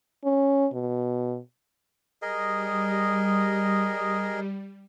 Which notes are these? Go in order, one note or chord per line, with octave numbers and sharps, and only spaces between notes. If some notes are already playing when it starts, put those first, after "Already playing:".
C#4
B2
G3 G#4 A#4 D#5